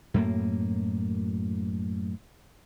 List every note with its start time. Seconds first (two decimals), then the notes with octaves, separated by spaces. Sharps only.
0.14 F#2 A2 A#3